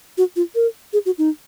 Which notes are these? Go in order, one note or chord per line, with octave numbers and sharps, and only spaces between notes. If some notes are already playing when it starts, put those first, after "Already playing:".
F#4
F4
A#4
G#4
F#4
D#4